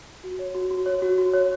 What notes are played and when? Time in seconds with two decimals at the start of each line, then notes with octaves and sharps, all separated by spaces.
0.24 F#4
0.39 C#5
0.55 F#4
0.71 F#4
0.86 C#5
1.02 F#4
1.18 F#4
1.33 C#5